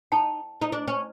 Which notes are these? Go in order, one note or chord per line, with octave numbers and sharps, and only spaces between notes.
D#4 G5 A5
D#4
D4
C#4